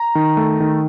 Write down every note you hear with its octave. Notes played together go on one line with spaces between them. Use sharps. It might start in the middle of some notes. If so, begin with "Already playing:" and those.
Already playing: A#5
D#3
A3
D#3